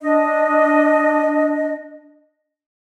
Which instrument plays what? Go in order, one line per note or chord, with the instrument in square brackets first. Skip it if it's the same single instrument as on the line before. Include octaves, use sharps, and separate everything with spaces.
[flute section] D4 D#5